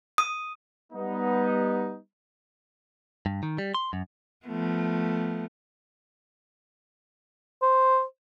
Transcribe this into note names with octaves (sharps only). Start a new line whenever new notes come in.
D#6
G3 B3 D#4
G2
D#3
G3
C6
F#2
F3 A3 B3
C5